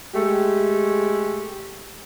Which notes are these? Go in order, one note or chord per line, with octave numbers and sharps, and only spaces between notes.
G#3 A3 G4